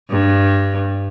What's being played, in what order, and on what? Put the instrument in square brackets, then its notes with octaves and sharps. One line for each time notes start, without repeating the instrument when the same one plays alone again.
[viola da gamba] G2